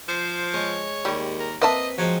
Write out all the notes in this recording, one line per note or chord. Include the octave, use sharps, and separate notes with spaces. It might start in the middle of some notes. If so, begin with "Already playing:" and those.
F3 C5
G#3 C#5
D#2 G3
A#4
A#3 C4 B4 D#5 E5 A5
F3 F#3 G#3 C4 C5